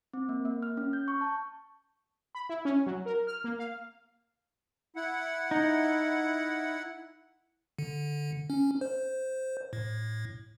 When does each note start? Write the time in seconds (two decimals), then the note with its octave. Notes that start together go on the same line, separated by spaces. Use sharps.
0.13 C4
0.29 A#3
0.45 A#3
0.62 F6
0.77 C#4
0.93 G6
1.08 C#6
1.21 A5
2.35 B5
2.49 E4
2.65 C#4
2.86 F#3
3.06 A#4
3.27 F6
3.44 A#3
3.59 F5
4.96 E4 F#5
5.51 D#4
7.79 D3
8.50 C#4
8.81 C5
9.73 A2